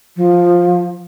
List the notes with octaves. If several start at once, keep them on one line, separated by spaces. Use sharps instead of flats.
F3